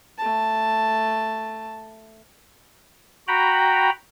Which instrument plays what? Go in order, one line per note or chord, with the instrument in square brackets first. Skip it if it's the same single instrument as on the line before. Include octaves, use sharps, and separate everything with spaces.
[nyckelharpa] A3 A5
[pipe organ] F#4 G5 A#5 B5